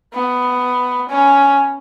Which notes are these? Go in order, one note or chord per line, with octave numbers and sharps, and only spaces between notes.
B3
C#4